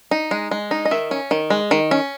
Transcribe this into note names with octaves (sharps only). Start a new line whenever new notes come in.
D#4
G#3
G#3
D#4
D#5
D#3 E5
C#4
D#3
G#3
D#3
C#4